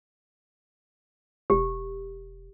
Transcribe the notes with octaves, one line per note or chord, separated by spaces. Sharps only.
E1 G4